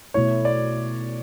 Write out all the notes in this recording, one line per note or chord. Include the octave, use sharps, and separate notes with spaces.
B2 A3 E4 C#5
D5